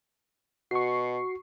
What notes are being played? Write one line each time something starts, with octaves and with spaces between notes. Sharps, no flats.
B2 F#4 C#6 C7